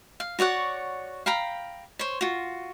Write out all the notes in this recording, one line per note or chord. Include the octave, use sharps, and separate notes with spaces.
F5
F#4 C#5 D5 F#5
F5 G5 A#5 B5
C5 C#5
F4 F#4